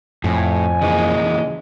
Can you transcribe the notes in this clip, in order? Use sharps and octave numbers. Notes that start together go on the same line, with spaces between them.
F2 A2 G#5
C#3 E3 G#3 A#3